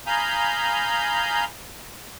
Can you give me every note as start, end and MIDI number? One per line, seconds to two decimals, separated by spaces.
0.07 1.44 77
0.07 1.44 80
0.07 1.44 82
0.07 1.44 83
0.07 1.44 87
0.07 1.44 91